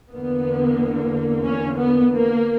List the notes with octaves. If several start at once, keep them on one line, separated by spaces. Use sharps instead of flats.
E2 D3 A#3 B3
C#4
B3
A#3